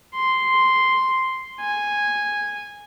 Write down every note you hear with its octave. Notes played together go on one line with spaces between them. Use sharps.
C6
G#5